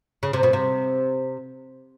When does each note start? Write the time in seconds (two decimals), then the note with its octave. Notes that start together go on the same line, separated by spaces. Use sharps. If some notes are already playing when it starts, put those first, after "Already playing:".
0.23 C#3
0.33 C3
0.43 B2
0.53 C3